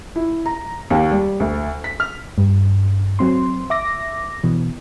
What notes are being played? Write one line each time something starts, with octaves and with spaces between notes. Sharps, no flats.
E4
A#5
D#2
G3
D2
B6
F6
G2
F#3 C4 C6
E5 D6 A#6
B2 E3